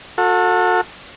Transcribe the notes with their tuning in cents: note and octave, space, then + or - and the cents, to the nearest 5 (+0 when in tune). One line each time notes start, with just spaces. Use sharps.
F#4 -35 A4 +20